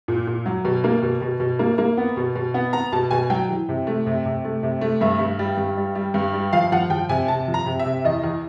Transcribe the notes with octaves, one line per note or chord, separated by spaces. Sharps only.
A#2
A#2
F#3
B2
A#3
B2
B2
B2
A#3
A#3
B3
B2
B2
B3
B3 A#5
B2 A5
B2 G#5
F#3 G5
E3
C3
A3
C3
C3
A3
C3
A3
G2 E5
G2
G3
G2
G3
G3
G2
G3
F3 F5
F3 F#5
F3 G5
C3 G#5
C3 A5
F3
A#5
C3
E5
C3
E2 D#5
E2